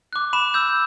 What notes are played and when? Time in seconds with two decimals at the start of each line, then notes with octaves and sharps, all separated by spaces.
0.13 D6 F#6
0.33 B5 E7
0.54 E6 G6